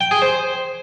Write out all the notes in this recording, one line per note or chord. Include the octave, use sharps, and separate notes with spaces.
G5
G#4
C5